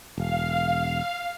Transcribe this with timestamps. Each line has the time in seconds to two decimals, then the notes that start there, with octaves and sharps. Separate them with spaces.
0.18 E1 F5